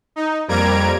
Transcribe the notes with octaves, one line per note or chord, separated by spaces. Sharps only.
D#4
F2 G3 A#3 A#5 G#6 D7